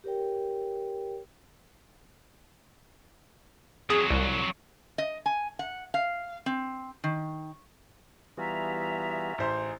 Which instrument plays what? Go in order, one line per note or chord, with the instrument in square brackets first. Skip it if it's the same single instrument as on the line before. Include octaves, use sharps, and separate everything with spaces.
[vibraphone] G4 A#4 C#5 G5
[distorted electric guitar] F2 F#3 [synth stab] G#4
[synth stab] C2
[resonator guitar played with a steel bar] D#5
G#5
F#5
F5
C4
D#3
[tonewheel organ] E3 G3 B3 [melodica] F4 F#4 G#4 [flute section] E5 A#5
[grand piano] A1 C5 C6 [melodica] D#4 G#4